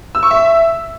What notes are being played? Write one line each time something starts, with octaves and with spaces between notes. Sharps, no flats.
E6
C#6
E5